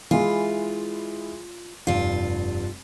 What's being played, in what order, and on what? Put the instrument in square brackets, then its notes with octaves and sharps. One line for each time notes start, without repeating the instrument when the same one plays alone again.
[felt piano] E3 G#3 E4 [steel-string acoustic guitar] F4
[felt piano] F1 [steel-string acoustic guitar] G2 F4